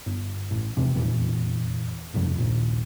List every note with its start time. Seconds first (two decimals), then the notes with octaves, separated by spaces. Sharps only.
0.06 G1
0.51 A1
0.77 E2 C3
0.95 F1 E2 A#2 E3
2.14 G1 C2 F2
2.38 A#1 D#2